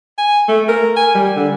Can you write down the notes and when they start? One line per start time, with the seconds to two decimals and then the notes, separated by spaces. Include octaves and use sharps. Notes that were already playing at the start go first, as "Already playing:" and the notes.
0.18 G#5
0.48 A3
0.68 A#4
0.96 G#5
1.14 G3
1.36 D3